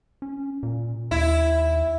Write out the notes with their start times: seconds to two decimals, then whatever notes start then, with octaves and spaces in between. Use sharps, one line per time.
0.22 C#4
0.63 A#2
1.11 D#2 E4